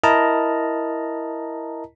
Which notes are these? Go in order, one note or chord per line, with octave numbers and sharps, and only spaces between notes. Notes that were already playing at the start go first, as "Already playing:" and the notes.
E4 A#4 D#5 A5 A#5